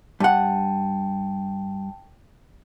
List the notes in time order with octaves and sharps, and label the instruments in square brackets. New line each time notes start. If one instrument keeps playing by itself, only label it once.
[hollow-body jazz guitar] G2 F#5 [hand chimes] G5 A5